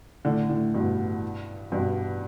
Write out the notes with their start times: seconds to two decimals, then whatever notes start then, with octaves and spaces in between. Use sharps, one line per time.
0.25 A2 D3
0.49 A2 D3
0.74 G2 B2
1.72 G2 B2